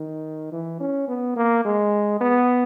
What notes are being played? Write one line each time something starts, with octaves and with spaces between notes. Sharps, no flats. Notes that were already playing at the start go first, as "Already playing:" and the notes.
Already playing: D#3
E3
C#4
B3
A#3
G#3
B3